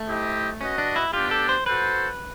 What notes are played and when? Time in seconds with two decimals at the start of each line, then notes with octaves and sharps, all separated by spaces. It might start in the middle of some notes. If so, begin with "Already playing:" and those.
Already playing: A3
0.08 E4 G4 C5 D#5
0.60 C#4 F#4 B4 D#5
0.78 D4
0.96 E4
1.13 B3 D4 F4 G4
1.31 A4
1.49 C5
1.66 F#4 A4 B4 C5